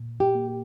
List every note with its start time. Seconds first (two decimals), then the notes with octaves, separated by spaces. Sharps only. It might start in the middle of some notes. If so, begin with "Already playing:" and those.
Already playing: A#2
0.20 G4
0.35 A#3